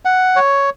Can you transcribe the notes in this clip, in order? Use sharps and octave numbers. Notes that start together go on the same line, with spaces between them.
F#5
C#5